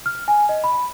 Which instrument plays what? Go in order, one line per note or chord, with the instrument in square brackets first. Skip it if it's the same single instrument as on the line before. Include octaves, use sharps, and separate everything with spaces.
[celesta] F6
G#5
D#5
B5